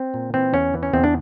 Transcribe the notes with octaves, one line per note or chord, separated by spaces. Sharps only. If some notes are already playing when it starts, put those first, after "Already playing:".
Already playing: C4
A#2
E3 C4
E2 C#4
E3
C#4
E2 C4
D4